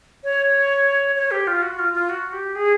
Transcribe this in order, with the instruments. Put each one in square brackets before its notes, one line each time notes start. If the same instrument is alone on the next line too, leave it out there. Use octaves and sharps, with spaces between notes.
[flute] C#5
C#5
G4
F4
F#4
F4
F4
F#4
G4
G#4